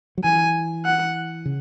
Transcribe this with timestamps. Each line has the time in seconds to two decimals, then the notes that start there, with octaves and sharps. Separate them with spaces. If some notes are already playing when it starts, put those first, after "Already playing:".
0.18 F#3
0.24 E3 G#5
0.85 F#5
1.46 C#3